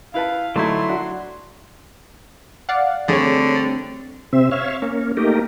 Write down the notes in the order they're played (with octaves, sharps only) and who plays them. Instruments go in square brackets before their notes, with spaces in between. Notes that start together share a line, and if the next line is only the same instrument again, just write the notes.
[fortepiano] E4 B4 A5 [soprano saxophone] F5
[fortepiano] D3 A3 D#4 [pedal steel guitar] F#3 E4 [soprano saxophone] C6
[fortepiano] D4 F#4
[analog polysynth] D5 F5 F#5
[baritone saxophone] D3 [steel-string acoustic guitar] G3 A3 C4 [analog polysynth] G#4 C#5
[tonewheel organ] C3 C4 E5
C#5 E5 F5
A#3 C#4
A3 A#3 D#4 G4 A#4